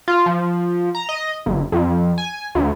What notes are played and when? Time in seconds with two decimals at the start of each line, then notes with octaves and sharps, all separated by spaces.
0.08 F4
0.26 F3
0.95 A#5
1.09 D#5
1.46 G1
1.72 F2
2.18 G#5
2.55 D2